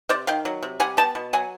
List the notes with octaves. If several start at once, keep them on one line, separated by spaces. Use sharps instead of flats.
C3 C5 D5
D#3 F5 G5
F#3
C3
G3 F#5 G#5
B3 G5 A5
B2
F#3 F#5 G#5